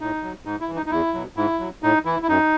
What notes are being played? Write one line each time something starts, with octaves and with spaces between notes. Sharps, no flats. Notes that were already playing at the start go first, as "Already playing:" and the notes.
A2 D#4
F#3
G#2 D#4
E4
E3
D#4
D#4
E2 E4
B2 F#3
G#2 E4
F#3
A2 D#4
E3 E4
E4
F#2 D#4